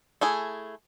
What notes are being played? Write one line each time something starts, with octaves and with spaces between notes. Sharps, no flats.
A3 E4 G#4